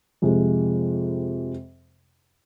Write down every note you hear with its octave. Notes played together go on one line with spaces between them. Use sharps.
F2 C3 F3 G#3